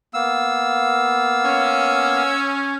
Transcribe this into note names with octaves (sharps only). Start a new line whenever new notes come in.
A#3 B3 F5 E6
C#4